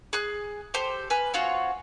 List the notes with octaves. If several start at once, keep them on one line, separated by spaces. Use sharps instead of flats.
G#4 F#6
G4 A4 C5
B4 G#5 F6
C4 F4 F#4 C#5